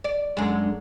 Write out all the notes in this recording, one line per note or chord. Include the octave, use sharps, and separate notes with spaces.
D5
F#2 D3 G#3